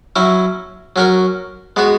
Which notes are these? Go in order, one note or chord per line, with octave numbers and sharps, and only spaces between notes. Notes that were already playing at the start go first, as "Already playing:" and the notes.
F#3 C#4 E4
F#3 C#4 F#4 A#4
G#3 B3 F#4 B4